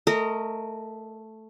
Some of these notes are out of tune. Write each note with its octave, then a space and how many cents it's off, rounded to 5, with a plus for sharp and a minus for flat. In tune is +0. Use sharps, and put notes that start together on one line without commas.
A3 +0 A#4 -20 D#5 +0